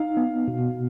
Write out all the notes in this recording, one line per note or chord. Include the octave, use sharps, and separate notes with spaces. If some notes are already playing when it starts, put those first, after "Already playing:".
Already playing: D#4 F5
B3
B2